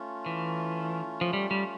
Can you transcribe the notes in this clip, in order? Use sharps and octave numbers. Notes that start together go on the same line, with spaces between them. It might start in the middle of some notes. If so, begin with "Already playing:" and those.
Already playing: A3 C#4 F4
E3
F3
G3
G3